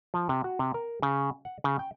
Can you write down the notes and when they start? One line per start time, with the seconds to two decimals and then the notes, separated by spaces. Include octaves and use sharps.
0.14 F3
0.29 C3
0.44 F#4
0.59 C3
0.74 A#4
1.02 C#3
1.45 F#5
1.64 C#3
1.79 G5